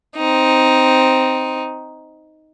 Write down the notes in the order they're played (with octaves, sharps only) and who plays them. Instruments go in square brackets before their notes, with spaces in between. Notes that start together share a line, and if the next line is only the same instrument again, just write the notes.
[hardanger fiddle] C4 D#4